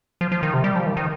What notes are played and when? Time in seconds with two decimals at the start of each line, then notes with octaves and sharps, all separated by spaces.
0.21 F3
0.32 F3
0.43 D#3
0.54 C3
0.64 G3
0.75 F3
0.86 D#3
0.97 D#3